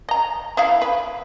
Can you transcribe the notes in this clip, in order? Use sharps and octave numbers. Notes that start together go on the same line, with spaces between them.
D#5 A#5
B3 E4 F5
B4